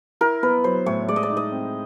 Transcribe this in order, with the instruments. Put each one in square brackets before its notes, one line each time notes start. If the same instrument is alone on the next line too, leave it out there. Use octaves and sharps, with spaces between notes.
[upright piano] E4 [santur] A#4
[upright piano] B3 [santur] B4
[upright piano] F#3 [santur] C5
[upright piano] A2 [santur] C#5
[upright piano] G#3 [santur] D5
[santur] D#5
D5
[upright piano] D#4
[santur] D#5
[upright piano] C4